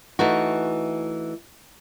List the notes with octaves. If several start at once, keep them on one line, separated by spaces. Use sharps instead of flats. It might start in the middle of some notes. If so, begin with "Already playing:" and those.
E3 A3 D#4 F#4